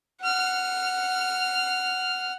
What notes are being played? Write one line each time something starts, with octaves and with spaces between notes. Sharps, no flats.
F#5 F6